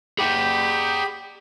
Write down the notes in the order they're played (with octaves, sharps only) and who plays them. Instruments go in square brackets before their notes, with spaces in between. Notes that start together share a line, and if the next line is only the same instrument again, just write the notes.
[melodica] G4 B5 [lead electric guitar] G#4 F#5